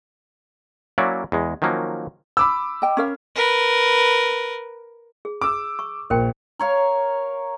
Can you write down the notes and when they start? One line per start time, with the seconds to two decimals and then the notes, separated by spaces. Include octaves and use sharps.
0.98 F#3 A#3 C#4 E4 D5 E5
1.32 E2 G#3
1.62 D#3 F3 F#3 A#3 C#4
2.37 B5 D6 E6
2.82 D#5 G5
2.97 C#4 A#4 F5
3.35 A#4 B4
5.25 G#4
5.41 D6 E6
5.79 C#6
6.10 A#1 A#4 C5 G5
6.59 A#4 C#5 F5